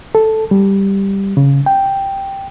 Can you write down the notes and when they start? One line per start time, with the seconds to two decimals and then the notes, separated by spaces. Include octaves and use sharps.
0.15 A4
0.51 G3
1.37 C#3
1.66 G5